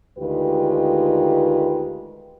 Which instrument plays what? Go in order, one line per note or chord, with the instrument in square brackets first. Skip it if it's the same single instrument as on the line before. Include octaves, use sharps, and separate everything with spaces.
[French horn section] D2 D#3 G#3 F4 G4 B4